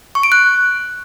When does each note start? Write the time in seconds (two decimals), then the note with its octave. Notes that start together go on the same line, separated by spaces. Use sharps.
0.15 C#6
0.23 D7
0.32 F#6